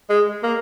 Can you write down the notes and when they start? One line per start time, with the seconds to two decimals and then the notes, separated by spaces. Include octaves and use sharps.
0.10 G#3
0.43 A#3